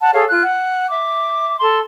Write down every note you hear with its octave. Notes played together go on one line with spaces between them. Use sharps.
F#5 A5
G#4 A4 C#5 F5
F4 F#6
F#5
E5 D6
A4 A5 C6